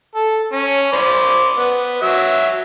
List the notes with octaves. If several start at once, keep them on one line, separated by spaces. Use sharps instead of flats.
A4
C#4
C5 D5 B5
B3
F#3 E5